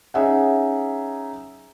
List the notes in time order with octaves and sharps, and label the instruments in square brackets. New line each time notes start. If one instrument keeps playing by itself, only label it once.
[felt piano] C#4 D#4 G#4 E5 F#5